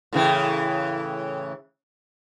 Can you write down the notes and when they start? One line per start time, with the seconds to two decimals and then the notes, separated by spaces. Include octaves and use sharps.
0.13 A2 C#3 E3